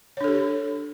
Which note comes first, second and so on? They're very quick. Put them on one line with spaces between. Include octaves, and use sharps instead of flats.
C#5 D4 A4 G4